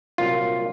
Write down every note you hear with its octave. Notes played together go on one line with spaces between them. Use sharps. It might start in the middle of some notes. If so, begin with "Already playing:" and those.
C2 A#2 F#3 F4